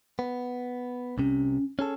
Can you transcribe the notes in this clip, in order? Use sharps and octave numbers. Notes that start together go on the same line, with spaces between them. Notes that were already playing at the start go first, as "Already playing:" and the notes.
B3
C2 C3 C#4
C#4 G#4 A4